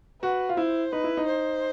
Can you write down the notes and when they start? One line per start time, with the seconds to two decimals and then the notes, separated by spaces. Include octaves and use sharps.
0.22 F#4 B4
0.49 F4
0.57 E4 C5
0.92 D#4 B4
1.04 E4
1.17 D#4
1.27 C5